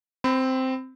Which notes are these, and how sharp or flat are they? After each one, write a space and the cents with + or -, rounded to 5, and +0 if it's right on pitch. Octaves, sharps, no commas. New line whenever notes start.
C4 -5 B5 +35